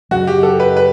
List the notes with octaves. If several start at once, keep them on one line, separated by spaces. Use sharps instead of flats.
F#2 C#3 F#3 F#4
G4
A4
B4
B4